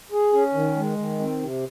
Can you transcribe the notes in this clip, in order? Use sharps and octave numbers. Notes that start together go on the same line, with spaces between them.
G#4
C#4
D#3
G#3
D#3
C4
C3